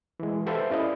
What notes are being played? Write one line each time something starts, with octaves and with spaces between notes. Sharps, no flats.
E3 G#3
G4 A4 B4 C5 E5 F5
C#4 E4 D5 D#5 F5